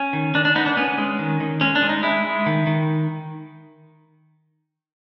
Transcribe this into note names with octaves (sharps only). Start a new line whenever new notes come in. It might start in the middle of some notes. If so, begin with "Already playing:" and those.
Already playing: C#4
D#3
D#3 D4
D4
B3 D#4
D4
B3 C#4
G#3
D#3
D#3
G#3 C#4
D4
G#3
D#4
G#3 E4
G#3
D#3
D#3